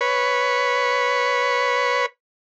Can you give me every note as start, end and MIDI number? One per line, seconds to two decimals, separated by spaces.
0.01 2.06 71
0.01 2.06 73